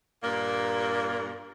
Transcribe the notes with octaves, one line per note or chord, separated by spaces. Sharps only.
G2 A#2 A#3